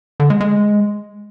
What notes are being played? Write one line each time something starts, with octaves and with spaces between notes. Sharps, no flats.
D3
G#3
G#3